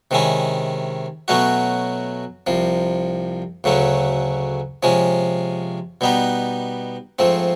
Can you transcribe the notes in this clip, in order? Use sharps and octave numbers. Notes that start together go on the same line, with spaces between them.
C3 D#3 G#3 C#4 E4
B2 F#3 A3 C#4 F#4
C2 C3 F3
D2 C#3 F#3 A3 C#4
C3 F3 G#3 C#4
B2 G3 B3 D#4 G4
G#2 F3 A3 C4